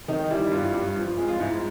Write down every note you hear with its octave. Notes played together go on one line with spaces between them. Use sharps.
D#3 D#4
G3 E4
G2 F4
G2
F3
G#3
F4
G#2 E4